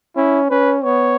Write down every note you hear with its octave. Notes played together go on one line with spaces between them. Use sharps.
C#4 E4
C#4 B4
B3 C#5